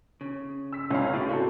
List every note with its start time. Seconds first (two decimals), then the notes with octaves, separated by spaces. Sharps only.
0.21 C#3
0.73 E6 B6
0.90 C#2 C#4 C#5 F5
1.13 A2 G#4 D5
1.29 B3 C4 F4 F#4 A4